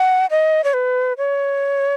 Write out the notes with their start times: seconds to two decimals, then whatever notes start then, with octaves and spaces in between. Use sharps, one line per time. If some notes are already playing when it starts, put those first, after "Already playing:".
Already playing: F#5
0.30 D#5
0.64 C#5
0.74 B4
1.18 C#5